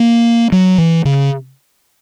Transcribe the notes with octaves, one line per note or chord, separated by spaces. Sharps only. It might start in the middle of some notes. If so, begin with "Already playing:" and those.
Already playing: A#3
F#3
E3
C#3